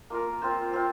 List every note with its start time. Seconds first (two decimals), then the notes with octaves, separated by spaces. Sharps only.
0.10 A#3 F4 A#4
0.42 C4 F4 C5
0.73 C4 F4